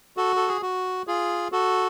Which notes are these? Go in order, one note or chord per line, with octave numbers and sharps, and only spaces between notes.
F#4 A4
A4
G#4
F#4
F4 G#4
F#4 A4